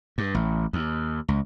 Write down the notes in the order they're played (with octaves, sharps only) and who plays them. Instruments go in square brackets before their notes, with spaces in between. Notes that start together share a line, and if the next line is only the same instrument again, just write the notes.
[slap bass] G2
A1
D#2
C#2